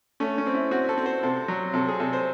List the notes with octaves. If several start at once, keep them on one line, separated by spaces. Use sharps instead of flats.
A3 C#4
C#4
C4
E4
C4 F#4
A4
C4
C5
C3 A4
F#3
C3 A4
G#4
C3 A4
C5